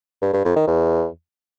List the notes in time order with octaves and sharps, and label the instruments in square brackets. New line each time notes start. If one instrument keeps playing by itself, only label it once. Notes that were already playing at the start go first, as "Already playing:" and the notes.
[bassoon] G2
G2
F2
D#3
E2